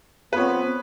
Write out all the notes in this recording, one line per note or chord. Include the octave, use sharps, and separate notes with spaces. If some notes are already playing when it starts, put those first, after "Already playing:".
F3 B3 C4 B4 C#5